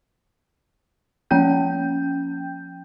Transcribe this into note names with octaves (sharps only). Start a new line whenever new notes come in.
F3 A#3 C#4 G5 G6